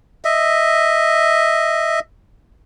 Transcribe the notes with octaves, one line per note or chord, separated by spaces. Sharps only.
D#5 E5